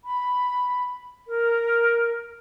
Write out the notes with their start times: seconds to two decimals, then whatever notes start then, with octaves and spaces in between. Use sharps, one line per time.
0.04 B5
1.28 A#4